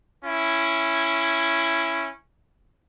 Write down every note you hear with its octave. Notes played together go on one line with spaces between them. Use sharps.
C#4 E4